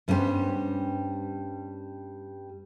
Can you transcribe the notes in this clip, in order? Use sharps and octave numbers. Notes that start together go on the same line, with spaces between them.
G2 G3 B3 C#4 G#4 C5